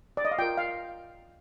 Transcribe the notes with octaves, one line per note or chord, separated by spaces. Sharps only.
D5
D#5
F5
F4 A#4 G5
F5